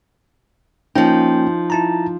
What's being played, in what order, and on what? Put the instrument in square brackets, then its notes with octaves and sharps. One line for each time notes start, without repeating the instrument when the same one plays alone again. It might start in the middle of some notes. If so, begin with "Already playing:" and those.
[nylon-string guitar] F3 D#4 [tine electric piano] A#3 C#4 G5
[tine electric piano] E4 A5 A#5